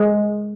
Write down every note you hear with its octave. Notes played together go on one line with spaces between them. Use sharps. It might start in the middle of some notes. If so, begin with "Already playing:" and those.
Already playing: G#3